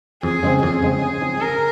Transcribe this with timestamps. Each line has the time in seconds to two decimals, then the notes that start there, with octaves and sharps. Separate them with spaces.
0.23 F2 G#4
0.43 C#3 G#3 C4
0.63 F2 G#4
0.83 C#3 G#3 C4
1.02 C#3
1.21 F3 C4 D#4
1.41 C#3 A#4